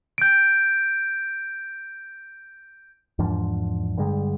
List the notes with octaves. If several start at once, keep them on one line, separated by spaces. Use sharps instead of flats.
G6 D7
E2 G#2 F3 D4
G2 D3 G3 G#3